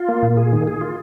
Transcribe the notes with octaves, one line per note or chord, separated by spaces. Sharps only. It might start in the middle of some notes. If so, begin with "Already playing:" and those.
Already playing: F4
A#3
A#2
G#4
D#3
G#4
F4